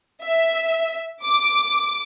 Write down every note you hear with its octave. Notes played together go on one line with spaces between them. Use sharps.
E5
D6